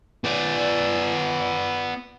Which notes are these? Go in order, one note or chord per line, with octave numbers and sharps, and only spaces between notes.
B3 D5